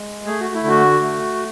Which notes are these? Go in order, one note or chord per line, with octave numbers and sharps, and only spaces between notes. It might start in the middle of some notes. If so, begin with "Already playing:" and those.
Already playing: G#3
A3 G#4
F#4
E4
D3 F#4
A3